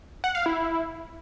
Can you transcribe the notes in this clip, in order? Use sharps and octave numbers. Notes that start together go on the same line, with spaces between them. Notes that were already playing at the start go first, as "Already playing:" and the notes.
F#5
F5
E4